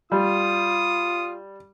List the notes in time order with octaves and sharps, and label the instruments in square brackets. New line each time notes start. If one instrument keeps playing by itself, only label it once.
[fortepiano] G3 [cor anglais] F4 [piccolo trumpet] D#6